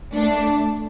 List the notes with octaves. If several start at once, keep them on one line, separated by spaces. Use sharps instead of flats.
A3 D4